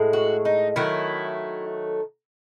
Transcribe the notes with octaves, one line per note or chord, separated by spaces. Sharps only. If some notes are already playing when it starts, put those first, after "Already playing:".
Already playing: A2 G#3
F#4
D#4
D#3 F#3 A3 E4